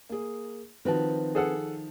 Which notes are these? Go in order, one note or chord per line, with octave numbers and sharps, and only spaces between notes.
A#3 G#4
D#3 F3 C4 F#4 B4 A5
G#4 A4 F#5